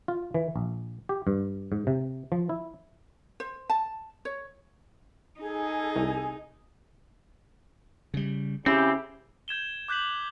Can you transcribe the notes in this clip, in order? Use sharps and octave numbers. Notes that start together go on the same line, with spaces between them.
F4
E3
A#1
G4
G2
G#2
C3
F3
E4
C5
A5
C#5
D#4 G#4 A4 G#5
C2
C#3 G3
C#3 C4 C#4 E4 G4
G6 G#6 E7 G7
D6 F#6 G6 B6 F#7